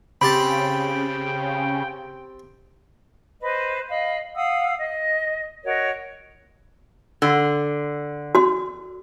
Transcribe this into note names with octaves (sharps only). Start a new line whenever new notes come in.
C#3 C4 G4 G5 A5 B5
B4 C5 D#5
D#5 F5 B5
F5 F#5 D#6 E6
D#5
F#4 A#4 C#5 D#5
D3
F#4 C6